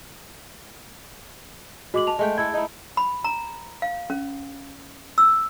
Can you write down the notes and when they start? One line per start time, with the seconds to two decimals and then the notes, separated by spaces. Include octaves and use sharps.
1.94 G#3 F#4 D6 F#7
2.07 A5 F7
2.19 G#3 A3 G5
2.38 E4 A4 G#6
2.54 D#4 E4
2.97 B5
3.24 A#5
3.82 F5
4.10 C#4
5.18 E6